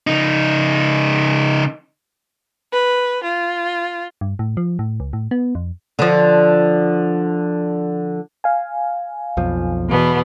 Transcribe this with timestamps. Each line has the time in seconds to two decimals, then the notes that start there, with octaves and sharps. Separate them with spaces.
0.07 C#3 D#4
2.72 B4
3.22 F4
4.21 G2
4.39 A2
4.57 F3
4.79 A2
5.00 C#2
5.13 A2
5.31 B3
5.55 F2
5.99 D3 F3
8.44 F5 G#5
9.37 B1 F2 F3
9.88 E2 B2 B3